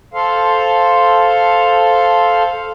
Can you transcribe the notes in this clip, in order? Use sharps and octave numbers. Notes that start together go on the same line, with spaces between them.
A4 C5 F5